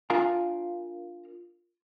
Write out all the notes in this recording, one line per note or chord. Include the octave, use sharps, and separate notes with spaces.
D4 F4 A#4 F5 G#5 A#5